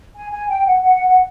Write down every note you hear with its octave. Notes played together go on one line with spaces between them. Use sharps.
G#5
G#5
G5
F#5
F#5
F#5